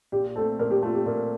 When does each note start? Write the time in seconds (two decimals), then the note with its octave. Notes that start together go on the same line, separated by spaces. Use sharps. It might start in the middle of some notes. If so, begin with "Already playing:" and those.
0.12 A#2 G4
0.36 A3 C4 A4
0.59 A#2 A#4
0.71 G4
0.83 A3 C4 F4
0.94 G4
1.06 A#2 A#4